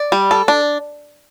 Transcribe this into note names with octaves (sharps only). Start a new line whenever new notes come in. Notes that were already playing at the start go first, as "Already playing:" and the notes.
Already playing: D5
G3
A4
D4